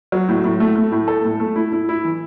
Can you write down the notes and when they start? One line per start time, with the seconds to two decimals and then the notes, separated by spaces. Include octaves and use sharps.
0.12 F#3
0.29 A2
0.44 A2
0.60 A3
0.76 A3
0.92 A2
1.08 A4
1.24 A2
1.40 A3
1.56 E4
1.72 E4
1.89 E4
2.05 E3